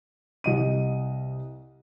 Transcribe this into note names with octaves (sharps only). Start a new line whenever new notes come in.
C2 D#5 D#7